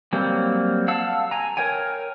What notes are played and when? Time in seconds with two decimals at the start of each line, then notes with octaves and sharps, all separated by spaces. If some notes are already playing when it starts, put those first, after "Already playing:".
0.13 F#3 G3 A#3 C4
0.88 F5 F#5 A5 E6
1.31 G#5 A#5
1.57 A#4 C#5 G5 G#5